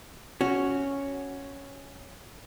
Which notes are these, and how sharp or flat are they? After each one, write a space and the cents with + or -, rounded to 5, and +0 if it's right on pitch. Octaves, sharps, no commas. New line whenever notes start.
C#4 +0 F#4 -5